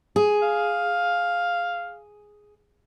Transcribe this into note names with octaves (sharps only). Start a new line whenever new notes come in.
G#4
F5